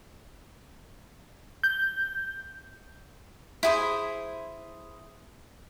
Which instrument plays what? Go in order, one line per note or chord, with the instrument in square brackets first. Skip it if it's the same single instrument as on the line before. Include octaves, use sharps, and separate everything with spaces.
[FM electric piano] G6
[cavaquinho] E4 G#4 C5